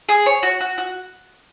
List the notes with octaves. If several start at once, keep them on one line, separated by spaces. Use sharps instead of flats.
G#4
C#5
F#4
F#4
F#4